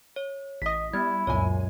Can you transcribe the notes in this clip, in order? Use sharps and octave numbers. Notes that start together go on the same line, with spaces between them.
C#5
A1 D#5 D#6 B6
G3 B3 E4 G#6
C#2 F#2 A#2 C#5 G#5